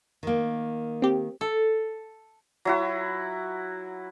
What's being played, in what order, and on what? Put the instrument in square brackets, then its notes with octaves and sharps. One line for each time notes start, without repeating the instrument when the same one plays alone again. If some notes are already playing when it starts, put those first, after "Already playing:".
[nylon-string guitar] D#3 A#3
[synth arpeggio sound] C4 G4
[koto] A4
[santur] F#3 E4 F#4